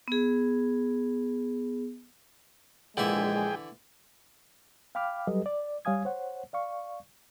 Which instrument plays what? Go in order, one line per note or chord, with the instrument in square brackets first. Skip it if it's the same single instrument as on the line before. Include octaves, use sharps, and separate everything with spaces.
[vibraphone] B3 G#4
[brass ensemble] A#1 G#3 [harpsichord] D3 E3 E5 [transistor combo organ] G#4 G5
[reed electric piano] F5 G5 B5 D6 F6
F#3 G3 G4 A4 B4 D#5
D5
G3 C#5 F5 G#5 D#6 G#6
C5 C#5 F#5
D5 F5 C#6